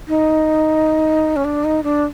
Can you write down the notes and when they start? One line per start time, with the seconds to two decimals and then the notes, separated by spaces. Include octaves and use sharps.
0.08 D#4
1.36 C#4
1.44 D4
1.64 D#4
1.83 D4